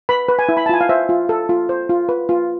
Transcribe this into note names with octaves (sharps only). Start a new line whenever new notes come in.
B4 B5
B4
G#5
E4
B5
A5
F4 G#5
F5
C5 E5
F4
A4
F4
C5
F4
B4
F4